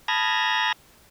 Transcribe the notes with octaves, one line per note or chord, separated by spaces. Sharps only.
A5 B5 D#6 F6 G#6 A#6